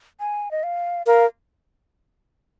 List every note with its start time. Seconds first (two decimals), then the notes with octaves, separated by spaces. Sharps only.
0.20 G#5
0.51 D#5
0.63 F5
1.07 A#4 F5